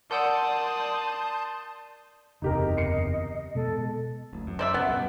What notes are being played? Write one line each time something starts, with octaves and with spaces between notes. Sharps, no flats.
A#4 D5 F#5 A5 C6 D#6 E6 G6
F#1 E2 C3 D#4 G4 A#4 D#5
C7 C#7
B2 G#3 A4
D1 A1
F#2
C5 D5 E5
C#2 B2 B3
G2 B2 G#3